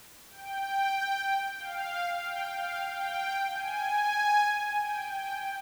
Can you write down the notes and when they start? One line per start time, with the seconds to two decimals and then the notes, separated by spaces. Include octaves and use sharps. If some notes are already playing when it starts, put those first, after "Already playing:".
0.30 G5
1.58 F5
2.23 G5
2.55 F5
2.87 G5
3.51 G#5
4.79 G5
5.11 G5